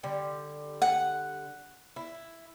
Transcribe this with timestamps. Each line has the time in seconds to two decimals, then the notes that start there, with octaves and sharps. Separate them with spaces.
0.03 D3 G3
0.82 F#5
1.96 E4